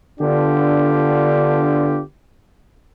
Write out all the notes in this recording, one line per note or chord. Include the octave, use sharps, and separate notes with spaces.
D3 B3 D4 F4 G4